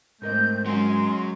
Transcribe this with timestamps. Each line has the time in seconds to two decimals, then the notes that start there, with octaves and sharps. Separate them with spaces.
0.22 G#2 A3 C4 A#4 D#5 G6
0.66 F#3 G#3 C#4 G#5 C6